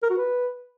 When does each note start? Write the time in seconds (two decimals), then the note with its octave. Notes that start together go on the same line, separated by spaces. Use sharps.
0.03 A#4
0.10 F#4
0.17 B4